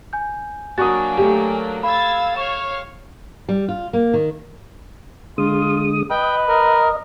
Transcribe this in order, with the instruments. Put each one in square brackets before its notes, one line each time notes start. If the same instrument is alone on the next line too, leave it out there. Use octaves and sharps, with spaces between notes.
[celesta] G#5 G6
[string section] F#3 A#3 D4 [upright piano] F#4 D#6 [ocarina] G#5 [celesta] C#6 A6
[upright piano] A3 G4
[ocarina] F5 [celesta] B5 [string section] E6 G#6 A6
[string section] C#5 F5 [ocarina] C#6 [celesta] E7
[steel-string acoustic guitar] G3
F4
A#3
D#3
[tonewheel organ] D3 G#3 D#6 [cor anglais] F4
[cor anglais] B4 [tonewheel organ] D#5 [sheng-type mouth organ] G5
[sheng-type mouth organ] A#4